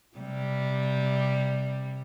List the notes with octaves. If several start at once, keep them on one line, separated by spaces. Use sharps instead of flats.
C3 G3